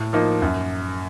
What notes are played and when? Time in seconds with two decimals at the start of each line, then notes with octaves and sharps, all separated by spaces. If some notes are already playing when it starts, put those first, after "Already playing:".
Already playing: A2
0.13 F3 A#3 D#4
0.42 F#2